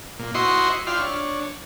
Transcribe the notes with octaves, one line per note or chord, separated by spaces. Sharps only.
A#2
E4 F#4 C5 D#5 C6 C#6
E4 F4 D5 G5 C6 F6
D4 C#5